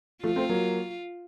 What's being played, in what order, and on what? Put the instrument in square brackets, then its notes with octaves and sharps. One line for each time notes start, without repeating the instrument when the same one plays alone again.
[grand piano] F3 A3 [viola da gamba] F4
[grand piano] A3 C4
F#3 A#3